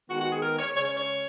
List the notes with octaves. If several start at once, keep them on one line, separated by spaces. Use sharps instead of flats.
D#3 G#3 B3 F#4
F#4
G#4
A#4
C#5
C#3 G#3 C#4 C#5
C#5
C#5